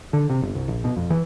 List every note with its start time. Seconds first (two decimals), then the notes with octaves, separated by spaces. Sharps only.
0.13 D3
0.30 C3
0.42 G1
0.55 C2
0.68 A#1
0.84 B2
0.97 F2
1.10 E3